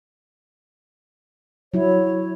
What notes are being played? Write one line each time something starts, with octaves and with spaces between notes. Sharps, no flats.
F#3 E4 C#5